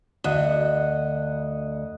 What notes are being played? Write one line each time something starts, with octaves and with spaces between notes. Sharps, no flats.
D2 D#5 F#5